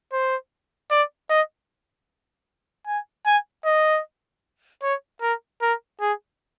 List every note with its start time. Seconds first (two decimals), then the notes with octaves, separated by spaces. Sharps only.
0.12 C5
0.91 D5
1.30 D#5
2.87 G#5
3.26 G#5
3.65 D#5
4.82 C#5
5.22 A#4
5.62 A#4
6.01 G#4